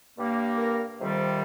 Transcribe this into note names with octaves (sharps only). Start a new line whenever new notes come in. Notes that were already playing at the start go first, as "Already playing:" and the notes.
G2 G3 A#3
A#4
F2 C3 D#3 G3 C4